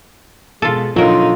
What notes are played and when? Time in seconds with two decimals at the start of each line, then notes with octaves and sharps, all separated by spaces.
0.62 B2 G#3 F4 A4
0.96 B2 D3 F#3 D#4 F4 A#4